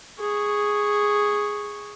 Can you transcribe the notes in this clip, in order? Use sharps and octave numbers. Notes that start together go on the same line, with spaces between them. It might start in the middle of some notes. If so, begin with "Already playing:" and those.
G#4 C#6